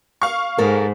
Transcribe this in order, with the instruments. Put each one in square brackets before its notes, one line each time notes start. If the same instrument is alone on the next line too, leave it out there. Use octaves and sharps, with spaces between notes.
[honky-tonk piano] F5 C#6
[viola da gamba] G#2 [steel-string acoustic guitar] G#3 A4 A#4